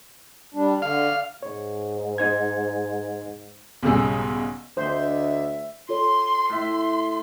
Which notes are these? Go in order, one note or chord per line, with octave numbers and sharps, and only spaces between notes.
G3 D4
D3 F5
G#2 C#5
D#4 C5 G#6
B1 G#2 C#3 G3 G#4 E6
D2 D4 C5 D#5 E5
F4 A4 C#5 C6
A2 E5 C6